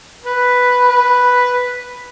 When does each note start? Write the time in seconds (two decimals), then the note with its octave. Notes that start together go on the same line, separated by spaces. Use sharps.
0.24 B4
0.89 B4